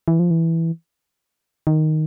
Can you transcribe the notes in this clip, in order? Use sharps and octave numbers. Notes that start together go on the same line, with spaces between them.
E3
F3
E3
D#3